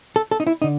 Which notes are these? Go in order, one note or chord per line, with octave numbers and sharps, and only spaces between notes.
A4
A4
D#4
E4
D3 D#4